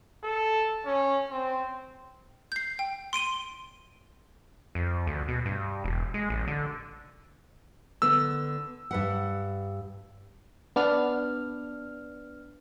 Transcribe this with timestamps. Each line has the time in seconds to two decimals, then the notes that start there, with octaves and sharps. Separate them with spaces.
0.23 A4
0.86 C#4
1.31 C4
2.52 G6 C7
2.79 G5
3.13 C6 D7 D#7 G7
4.75 F2
5.07 D2
5.28 B2
5.46 G2
5.84 E1
6.14 G#3
6.30 A1
6.47 D3
8.02 D3 B3 E6
8.91 G2 B4 F#5
10.76 B3 D4 F6